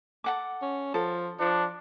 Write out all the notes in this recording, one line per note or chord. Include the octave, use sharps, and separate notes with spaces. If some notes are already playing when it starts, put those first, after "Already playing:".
A4 F#5 D6
C#4
F3 A4
F3 D4